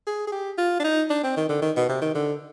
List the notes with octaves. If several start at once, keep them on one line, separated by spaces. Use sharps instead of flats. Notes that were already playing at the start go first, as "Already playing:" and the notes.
G#4
G#4
G4
F4
D4
D#4
D4
C4
D#3
D3
D#3
B2
C3
D#3
D3